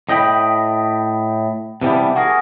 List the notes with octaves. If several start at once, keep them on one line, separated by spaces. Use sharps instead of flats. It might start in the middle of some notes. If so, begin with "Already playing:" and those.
A2 D#5 G5 A#5 B5
C3 E3 G3 B3 D4
F#4 G#4 A#4